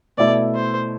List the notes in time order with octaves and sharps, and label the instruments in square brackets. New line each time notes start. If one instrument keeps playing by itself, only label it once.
[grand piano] B2 A3 E4 [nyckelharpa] D5
[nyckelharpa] C5